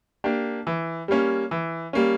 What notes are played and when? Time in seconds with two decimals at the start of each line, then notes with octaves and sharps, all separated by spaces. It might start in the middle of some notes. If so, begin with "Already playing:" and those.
0.24 A#3 D4 G4
0.67 E3
1.08 G3 A#3 C#4
1.51 E3
1.93 G3 A#3 C#4